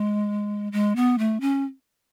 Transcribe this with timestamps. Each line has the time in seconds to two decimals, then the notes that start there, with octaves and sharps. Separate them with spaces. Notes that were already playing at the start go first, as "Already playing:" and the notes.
Already playing: G#3
0.72 G#3
0.96 B3
1.18 A3
1.41 C#4